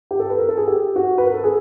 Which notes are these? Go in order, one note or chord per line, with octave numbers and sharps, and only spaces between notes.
G4
A4
B4
A#4
A4
G#4
G4
F#4
B4
A#4
A4
G#4